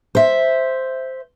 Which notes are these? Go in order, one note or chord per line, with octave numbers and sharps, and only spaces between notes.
C5 E5